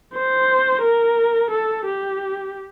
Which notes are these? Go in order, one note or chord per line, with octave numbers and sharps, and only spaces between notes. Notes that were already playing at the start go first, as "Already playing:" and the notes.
C5
A#4
A4
G4